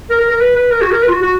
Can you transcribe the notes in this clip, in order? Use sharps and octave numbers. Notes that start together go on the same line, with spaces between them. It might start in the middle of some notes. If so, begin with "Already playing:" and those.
A#4
A#4
A#4
B4
B4
A#4
F#4
A#4
B4
F4
F#4
F#4